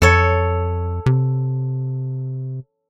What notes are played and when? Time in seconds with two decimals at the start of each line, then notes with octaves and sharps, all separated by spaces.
0.02 F2 A4 C#5
1.06 C3